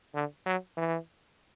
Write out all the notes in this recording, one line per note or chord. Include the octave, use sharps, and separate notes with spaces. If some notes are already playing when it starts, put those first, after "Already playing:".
D3
F#3
E3